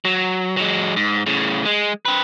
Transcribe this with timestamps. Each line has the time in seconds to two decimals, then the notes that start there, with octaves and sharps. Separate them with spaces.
0.05 F#3
0.57 F#3 G#3
0.96 G#2
1.26 A2 C#3
1.65 G#3
2.05 C4 B4